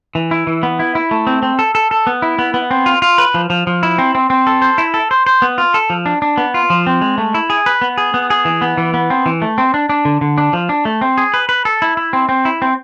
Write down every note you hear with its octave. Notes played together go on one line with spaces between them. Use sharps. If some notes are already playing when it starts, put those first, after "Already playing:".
E3
E4
E3
B3
E4
E4
A3
C4
C4
A4
A4
A4
B3
E4
B3
B3
C4
F4
F4
B4
F3
F3
F3
E4
C4
C4
C4
A4
C5
E4
A4
C5
C5
B3
F4
A4
F3
D4
D4
B3
F4
F3
C4
G#3
A3
E4
G#4
B4
B3
G#4
B3
G#4
E3
B3
E3
B3
C4
E3
A3
C4
D4
D4
D3
D3
D4
F3
D4
A3
C4
G#4
B4
B4
A4
E4
E4
C4
C4
E4
C4